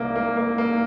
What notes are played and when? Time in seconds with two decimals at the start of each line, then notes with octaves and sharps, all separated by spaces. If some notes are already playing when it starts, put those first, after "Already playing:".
Already playing: C2 A#3
0.16 A#3
0.37 A#3
0.58 A#3